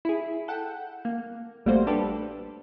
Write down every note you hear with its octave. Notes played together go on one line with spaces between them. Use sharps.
E4 G#4
A4 F#5 G5
A#3
A1 G3 A3 A#3 F#4 C5
D4 G4 A4 B4